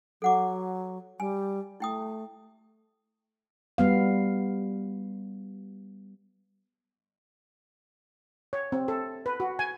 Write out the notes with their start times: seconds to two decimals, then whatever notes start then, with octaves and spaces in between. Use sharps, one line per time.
0.22 F#3 A4 F#5 D6
1.20 G3 G#5
1.80 A3 E4 G5 D#6
3.78 G3 B3 F5
8.53 C#5
8.72 C4
8.88 A4
9.26 B4
9.40 F#4
9.59 G#5